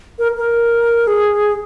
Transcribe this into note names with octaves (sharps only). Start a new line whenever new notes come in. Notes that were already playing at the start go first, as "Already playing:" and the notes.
A#4
A#4
G#4